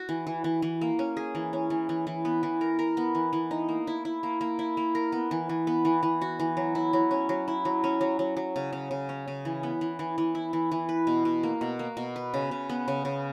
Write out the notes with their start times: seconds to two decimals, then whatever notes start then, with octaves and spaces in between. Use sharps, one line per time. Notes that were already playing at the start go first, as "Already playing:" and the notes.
Already playing: F#4
0.09 E3
0.27 E3
0.44 E3
0.62 E3
0.81 A#3
0.99 C#4
1.17 G#4
1.35 E3
1.53 C#4
1.70 E3
1.89 E3
2.07 E3
2.25 B3
2.43 E3
2.61 A#4
2.79 A#4
2.97 B3
3.15 E3
3.33 E3
3.51 D#4
3.69 A#3
3.87 E4
4.05 E4
4.23 A#3
4.41 A#3
4.59 E4
4.77 A#3
4.95 A#4
5.12 B3
5.31 E3
5.49 E3
5.67 B3
5.85 E3
6.03 E3
6.21 F#4
6.40 E3
6.57 F#3
6.75 E4
6.93 F#3
7.11 C#4
7.29 F#3
7.48 E4
7.65 F#3
7.84 C#4
8.01 F#3
8.19 F#3
8.37 F#3
8.56 C#3
8.73 C#3
8.91 C#3
9.09 C#4
9.28 C#3
9.45 E3
9.63 B3
9.81 E3
9.99 E3
10.18 E3
10.35 E4
10.53 E3
10.71 E3
10.89 B4
11.07 B2
11.25 B2
11.43 A#3
11.61 B2
11.79 A#3
11.97 B2
12.16 B4
12.34 C#3
12.51 C#3
12.70 B3
12.88 C#3
13.05 C#3